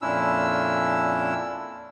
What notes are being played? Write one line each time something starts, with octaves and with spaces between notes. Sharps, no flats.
F2 A#2 C#4 D4 E4 E6